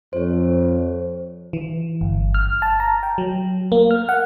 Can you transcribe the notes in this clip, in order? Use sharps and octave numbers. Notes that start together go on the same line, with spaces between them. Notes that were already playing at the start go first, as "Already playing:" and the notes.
F2 C5 C#5
E3
G1
F6
A5
A#5
G5
F#3
A#3
F6
F#5